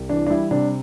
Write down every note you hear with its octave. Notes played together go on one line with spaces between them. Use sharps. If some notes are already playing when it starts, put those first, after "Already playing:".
Already playing: C2
E3 D4
D4
G3 E4
C3 D4